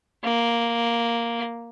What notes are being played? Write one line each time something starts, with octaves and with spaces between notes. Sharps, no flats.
A#3